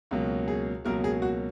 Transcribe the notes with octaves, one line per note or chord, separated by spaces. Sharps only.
C#2 B2 F#3 A#3
G#4
C#2 B2 F#3 A#3 A#4
G#4
F#4